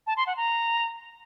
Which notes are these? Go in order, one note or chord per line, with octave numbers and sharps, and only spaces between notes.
A5
C6
F#5
A#5